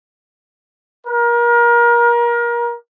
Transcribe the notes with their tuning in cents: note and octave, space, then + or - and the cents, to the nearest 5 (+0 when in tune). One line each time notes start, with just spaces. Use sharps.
A#4 +30